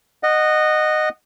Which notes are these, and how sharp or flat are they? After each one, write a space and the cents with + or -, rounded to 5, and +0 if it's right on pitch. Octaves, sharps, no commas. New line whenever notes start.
D#5 -15 F#5 +0